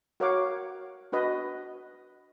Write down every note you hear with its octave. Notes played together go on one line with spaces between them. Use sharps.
F#4 A#4 C#5 F5 F#5 D6
D4 F#4 B4 D#5